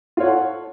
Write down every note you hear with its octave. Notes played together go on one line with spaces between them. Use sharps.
F4 A4 C#5 F#5